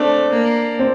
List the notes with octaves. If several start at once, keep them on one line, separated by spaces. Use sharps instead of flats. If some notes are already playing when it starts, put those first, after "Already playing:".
Already playing: A3 C4 D4
A#3
C4